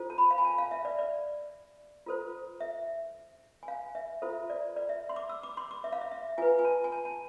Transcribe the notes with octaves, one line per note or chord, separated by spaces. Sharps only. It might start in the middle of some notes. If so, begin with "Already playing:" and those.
Already playing: F4 A4 C5
A5
B5
F5
G#5
A5
F5
E5
D5
D5
F4 A4 C5
E5
G#5
F5
E5
F4 A4 C5 E5
D5
D5
E5
C6
D6
E6
D6
C6
D6
E5
F5
E5
E5
F4 B4 G#5
G#5
A5
G#5
A5
A5